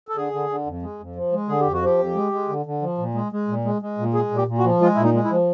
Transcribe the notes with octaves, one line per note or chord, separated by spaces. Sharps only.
A4
D3 G#4
D3
D3
F2
G#3
F2
F3
G#3
D3 G#4
G4
F2
F#4
F3 G4
F2
G#3
G#3
D3
D3
F3
A#2
G#3
G#3
A#2
G#3
G#3
A#2
G#3 G#4
A#2
G4
A#2
F#4
F3
G#3 F4
E4
A#2
D#4
G#3
E4
F3